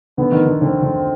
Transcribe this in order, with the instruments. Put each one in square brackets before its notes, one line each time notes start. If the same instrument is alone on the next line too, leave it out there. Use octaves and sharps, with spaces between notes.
[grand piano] D3 [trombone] B3
[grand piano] D#3
D3
[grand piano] D3 [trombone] C4
[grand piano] D3